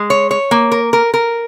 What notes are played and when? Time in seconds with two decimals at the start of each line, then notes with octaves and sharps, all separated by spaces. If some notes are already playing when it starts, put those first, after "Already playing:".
Already playing: G#3
0.10 C#5
0.31 C#5
0.51 A#3
0.72 A#4
0.93 A#4
1.14 A#4